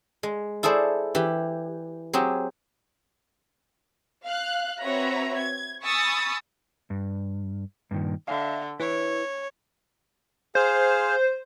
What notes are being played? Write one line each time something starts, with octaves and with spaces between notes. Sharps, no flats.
G#3
E4 G#4 A4 C5 D5
E3 G4
F#3 C4 G4 G#4
F5 F#6
C4 F#4 B4 C#5 E5 A#5
G#6
G#5 B5 C#6 D#6 E6 A6
G2
G2 A#2 D#3
D3 E5 F5
E4 B4 C#5
G#4 C5 F5